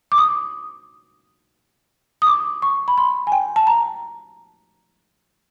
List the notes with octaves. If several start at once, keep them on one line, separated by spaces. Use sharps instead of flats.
D6
D#6
D#6
D6
C#6
B5
C6
G#5
G5
A5
A#5